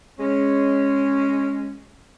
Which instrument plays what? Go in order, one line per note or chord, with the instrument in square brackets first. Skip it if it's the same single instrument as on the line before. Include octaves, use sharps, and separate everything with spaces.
[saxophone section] G#3 C#4